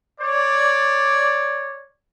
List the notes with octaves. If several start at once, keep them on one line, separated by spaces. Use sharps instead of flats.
C#5 D5